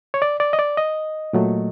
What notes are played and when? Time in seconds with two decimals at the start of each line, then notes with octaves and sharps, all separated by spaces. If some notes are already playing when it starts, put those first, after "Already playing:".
0.14 C#5
0.22 D5
0.40 D5
0.53 D#5
0.59 D5
0.77 D#5
1.33 A#2 F#3 A3